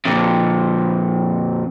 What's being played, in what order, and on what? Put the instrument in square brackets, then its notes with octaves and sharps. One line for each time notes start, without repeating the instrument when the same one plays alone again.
[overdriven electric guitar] F2 A#2